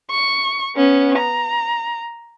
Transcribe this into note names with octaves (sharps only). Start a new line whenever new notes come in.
C#6
B3 C#4
A#5